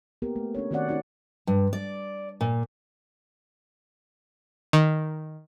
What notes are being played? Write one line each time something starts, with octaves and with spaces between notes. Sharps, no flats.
A#3 B3 G4 A#4
A3
C#4 D4 C#5
D#3 C4 F#4 C#5 D5 F#5
C#4 D#4 F#4 D5
G2
D5
A#2
D#3